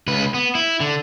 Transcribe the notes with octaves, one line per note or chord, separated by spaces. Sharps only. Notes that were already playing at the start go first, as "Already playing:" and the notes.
C#2 B4
B3
E4
D3